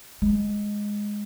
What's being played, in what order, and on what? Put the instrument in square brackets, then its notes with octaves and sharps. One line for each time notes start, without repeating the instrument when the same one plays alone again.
[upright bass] G#3